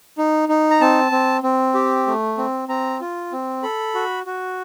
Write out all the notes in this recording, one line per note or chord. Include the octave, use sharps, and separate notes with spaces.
D#4
D#4
A#5
C4 A5
C4
C4
G4
A3
C4
C4 A#5
F4
C4
A4 B5
F#4
F#4